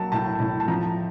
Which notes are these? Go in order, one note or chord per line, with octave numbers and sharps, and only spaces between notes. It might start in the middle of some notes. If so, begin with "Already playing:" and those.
Already playing: F#3 A#3 A5
A2 A5
A2
A5
F3 A#5